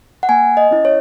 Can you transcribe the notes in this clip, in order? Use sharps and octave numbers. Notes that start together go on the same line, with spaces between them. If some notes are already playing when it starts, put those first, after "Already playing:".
F#5
A#3 G#5
D#5
C#4 E4
C#5